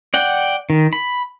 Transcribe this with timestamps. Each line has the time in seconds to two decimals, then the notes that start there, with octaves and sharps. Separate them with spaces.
0.14 D5 F#5 G5
0.70 D#3
0.93 B5